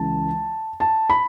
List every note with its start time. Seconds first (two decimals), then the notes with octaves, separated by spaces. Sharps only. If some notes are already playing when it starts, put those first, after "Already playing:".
Already playing: C#2 C#3 E3 A5
0.80 A5
1.10 B5